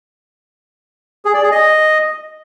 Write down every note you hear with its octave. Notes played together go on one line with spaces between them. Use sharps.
G#4
D5
G#4
D#5